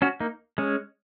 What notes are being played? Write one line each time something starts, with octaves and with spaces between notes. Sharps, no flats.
C#4 F#4
A#3 D#4
G#3 C#4